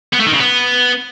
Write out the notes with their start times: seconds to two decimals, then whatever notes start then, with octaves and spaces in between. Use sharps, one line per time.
0.13 B3
0.20 A3
0.27 D#3
0.33 C#3
0.40 B3